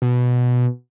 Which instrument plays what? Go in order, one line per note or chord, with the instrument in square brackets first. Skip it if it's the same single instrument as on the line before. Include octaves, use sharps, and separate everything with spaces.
[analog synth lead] B2